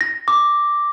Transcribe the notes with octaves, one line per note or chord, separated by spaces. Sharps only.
A#6
D6